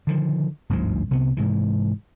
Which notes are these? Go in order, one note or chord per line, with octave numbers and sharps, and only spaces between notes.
D3 D#3 F3
G1 D2 G#2 F3
C2 C3 B3
G#2 C3 E3